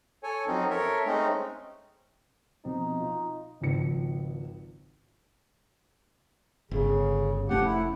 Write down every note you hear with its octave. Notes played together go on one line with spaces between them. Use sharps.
A4 C#5 G#5
F2 F#3 C4 C#4 D#4
A4 A#4 C#5 E5
G#3 A3 C4 C#4 D#4
B2 F3 C4 D#4
F4
G#1 C#2 F3 C#7
G1 C#3
F1 F3 A3 C#4 G4 F#5
E4